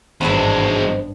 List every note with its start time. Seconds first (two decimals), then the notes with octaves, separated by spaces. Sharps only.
0.21 G#1 E2 G2 G#3 B3 D4 C5 E5